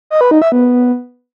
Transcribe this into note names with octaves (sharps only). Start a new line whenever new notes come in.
D#5
B4
D#4
E5
B3